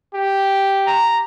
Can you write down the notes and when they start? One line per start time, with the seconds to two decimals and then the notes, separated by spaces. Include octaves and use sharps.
0.14 G4
0.87 A#5